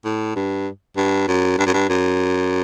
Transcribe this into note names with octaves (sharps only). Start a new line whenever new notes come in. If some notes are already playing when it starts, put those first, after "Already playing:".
A2
G2
G2
F#2
G2
F#2
G2
F#2